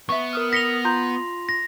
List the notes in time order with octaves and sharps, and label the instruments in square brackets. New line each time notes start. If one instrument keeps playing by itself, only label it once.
[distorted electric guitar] B3 [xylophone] E5 C#6
[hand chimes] A#4 D#6 F6
[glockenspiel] A#6 F7 [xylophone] B6 C#7 G7
[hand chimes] F4 C6 [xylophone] A#5 G6
[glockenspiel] A#6